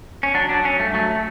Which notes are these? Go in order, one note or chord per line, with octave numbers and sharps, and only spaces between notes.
C#4
F#3 D4
F#3 D4
F#3 C#4
G2 A3
F#3 A3